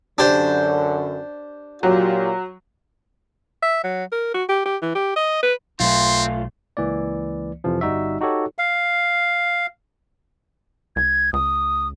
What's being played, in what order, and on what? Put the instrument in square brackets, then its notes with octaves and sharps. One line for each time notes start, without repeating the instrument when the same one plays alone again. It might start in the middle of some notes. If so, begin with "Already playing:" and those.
[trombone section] F#2 D3 [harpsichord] D4 G4 C5
[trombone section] A#2 F4 G4 [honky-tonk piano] F#3
[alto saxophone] E5
F#3
A#4
F#4
G4
G4
E3
G4
D#5
B4
[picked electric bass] B1 B2 F#3 [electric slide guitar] A3 F4 [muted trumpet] C4 [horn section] C6
[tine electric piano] C#2 E3 A#3 D5
F2 C3 E3 F3
G1 G3 D#4 F#4 E5
D#4 F#4 G4 A4 C#5
[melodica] F5
[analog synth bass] C2 [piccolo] G#6
[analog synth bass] C#2 [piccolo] D#6